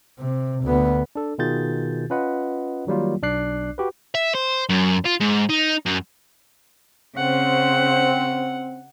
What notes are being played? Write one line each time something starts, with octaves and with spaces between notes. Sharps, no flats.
C3
D2 B3
D4 A4
B2 D#3 F4 G#4 G6 A6
C#4 F4 B4 D#5 F#5
D#3 F#3 G3 A#3 F4
B1 D4 D5 D6 F#6 C7
F#4 G4 B4
E5
C5
F#2
F4
G#2
D#4
F#2
C#3 C4 C5 F#5